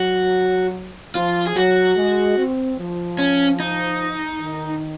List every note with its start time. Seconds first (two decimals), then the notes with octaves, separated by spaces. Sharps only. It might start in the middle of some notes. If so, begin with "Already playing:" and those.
Already playing: F#3 F#4
1.15 F3 F4
1.47 G#4
1.55 F#3 F#4
1.96 G#3
2.37 C4
2.78 F3
3.19 C#4
3.60 D#4
4.41 D#3